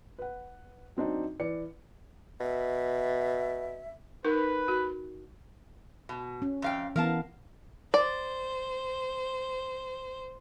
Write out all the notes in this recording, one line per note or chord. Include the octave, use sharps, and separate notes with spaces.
B4 F#5
F#3 C4 D4 D#4
E3 D5 C#7
B2 E5
D#4 A#4 B4
F#4
B2
C#4
F2 F5 G5
E3 B3 A#4 F5 A5
C5 D5